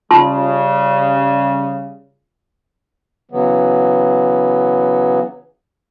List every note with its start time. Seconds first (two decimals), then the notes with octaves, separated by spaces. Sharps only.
0.11 C#3 G3 F4 A5 C6
3.31 C#3 E3 F#3 B3